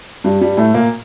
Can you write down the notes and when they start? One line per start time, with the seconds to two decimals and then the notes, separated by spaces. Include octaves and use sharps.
0.24 G2 G3
0.41 G2 G3
0.57 A2 A3
0.74 A#2 A#3